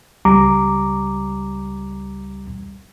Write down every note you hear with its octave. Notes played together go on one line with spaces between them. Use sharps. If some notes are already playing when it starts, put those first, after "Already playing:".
C#2 G3 A#5 D6